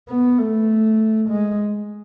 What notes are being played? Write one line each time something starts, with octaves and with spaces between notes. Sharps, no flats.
B3
A3
G#3